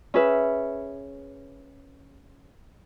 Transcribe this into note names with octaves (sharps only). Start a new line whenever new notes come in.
C#4 G#4 B4 E5